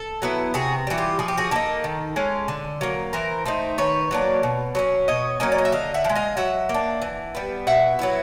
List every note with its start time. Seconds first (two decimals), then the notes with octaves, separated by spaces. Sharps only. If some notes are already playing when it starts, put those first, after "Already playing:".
Already playing: A4
0.22 F#3 B3 E4
0.54 C3 F#4 G#4
0.87 E3 G3 F#4
0.98 F4 G4
1.19 F3 G#4
1.28 G4
1.37 F#4 G#4
1.51 A#3 D#4 G4 A4
1.84 D#3
2.16 G#3 C#4 F4
2.48 D3
2.81 F#3 A#3
3.13 E3 A#4 C5
3.46 A3 C4 D#4
3.78 D#3 B4 C#5
4.11 F#3 A#3 D4
4.43 B2
4.75 F#3 A3 C#4
5.08 B2 C#5 D#5
5.40 F#3 A#3 C#4 D#5 F5
5.52 D5
5.58 D#5
5.65 E5
5.72 D3 D#5 F5
5.94 E5 F#5
6.04 F3
6.09 G#3
6.15 D#5 F5
6.37 F#3 E5 F#5
6.69 A#3
6.74 D4
7.02 E3
7.35 G3 B3
7.67 B2 E5 F#5
7.99 F#3 B3 E4